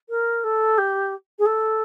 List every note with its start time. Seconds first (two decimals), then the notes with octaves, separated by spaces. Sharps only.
0.09 A#4
0.44 A4
0.78 G4
1.39 G#4
1.46 A4